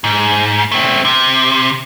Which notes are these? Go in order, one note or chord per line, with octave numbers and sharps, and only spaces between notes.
G#2
A3 C4
C3